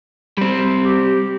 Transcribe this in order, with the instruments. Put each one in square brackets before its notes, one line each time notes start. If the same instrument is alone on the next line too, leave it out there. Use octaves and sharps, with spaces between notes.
[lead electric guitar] G3 C4
[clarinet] G4